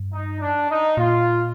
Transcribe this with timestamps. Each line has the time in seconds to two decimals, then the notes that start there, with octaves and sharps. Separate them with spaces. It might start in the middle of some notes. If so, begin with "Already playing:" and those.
Already playing: G2
0.13 D#4
0.40 D4
0.70 D#4
0.97 A#2 F4